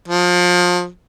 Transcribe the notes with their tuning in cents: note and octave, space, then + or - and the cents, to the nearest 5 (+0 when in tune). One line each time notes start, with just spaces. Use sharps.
F3 +30